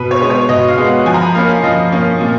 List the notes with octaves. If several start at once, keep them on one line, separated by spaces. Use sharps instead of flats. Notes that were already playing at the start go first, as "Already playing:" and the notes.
Already playing: B2 B4
C#5
G#3 B3
C#5
B2 D#5
F5
G#3 B3
F#5
F3 G#5
A#5
B5
A#3 C#4 F5
F5
F3 D#5
A#3 C#4
A#2